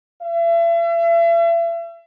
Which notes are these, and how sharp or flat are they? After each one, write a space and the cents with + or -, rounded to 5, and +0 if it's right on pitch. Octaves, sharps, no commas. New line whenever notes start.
E5 +40